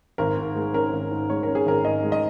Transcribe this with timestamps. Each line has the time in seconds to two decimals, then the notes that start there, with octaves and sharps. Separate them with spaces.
0.18 G#1 A#4
0.37 G#2
0.55 G#3
0.74 C#4 A#4
0.93 G#1
1.11 G#2
1.30 G#3 C#5
1.43 C#4 A#4
1.55 G#4
1.66 G#1 A#4
1.85 G#2 D#5
2.03 G#3
2.12 D#5